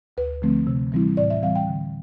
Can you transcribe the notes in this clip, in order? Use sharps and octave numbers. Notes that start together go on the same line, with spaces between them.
D2 B4
D3 F3 A3 C4
C3
E3 G3 C4 E4
A2 D5
E5
E3 G3 C4 F5
G5
D3